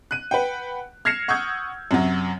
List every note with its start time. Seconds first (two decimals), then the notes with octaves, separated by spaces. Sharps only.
0.11 F#6 D#7
0.31 B4 F#5 G5
1.05 F6 G#6 A#6 C7 C#7 E7
1.28 F#5 C#6 D#6 E6 G6 G#6
1.91 F#2 C3 F#3